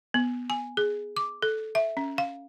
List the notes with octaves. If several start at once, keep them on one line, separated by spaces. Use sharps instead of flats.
B3
G#5
G#4
D6
A4
E5
C#4
F5